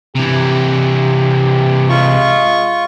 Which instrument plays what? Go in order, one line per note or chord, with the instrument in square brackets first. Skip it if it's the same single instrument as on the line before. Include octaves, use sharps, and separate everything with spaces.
[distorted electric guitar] C3 E3 [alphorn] G4
[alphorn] G#3 [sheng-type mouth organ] F4 C#6